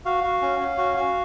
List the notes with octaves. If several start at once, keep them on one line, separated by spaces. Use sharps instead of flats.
F#4 F5
F#4
C#4
C#4
F#4
F#4